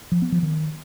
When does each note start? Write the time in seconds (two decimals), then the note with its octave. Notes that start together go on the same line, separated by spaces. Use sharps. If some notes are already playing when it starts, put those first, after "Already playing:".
0.12 F3
0.22 B3
0.32 F3
0.43 D#3